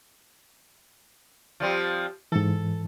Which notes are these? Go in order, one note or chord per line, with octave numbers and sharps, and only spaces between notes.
F3 G3 C4
G#2 E3 A4